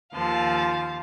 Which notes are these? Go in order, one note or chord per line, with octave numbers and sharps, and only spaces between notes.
D#2 F3 F5 A5